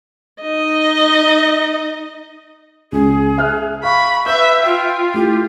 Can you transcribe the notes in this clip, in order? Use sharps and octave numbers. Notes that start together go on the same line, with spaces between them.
D#4 D#5
C#2 G#4
E5 F6 F#6
F5 B5 C#6
B4 E5 G6
F4 G5
A3 E4 G4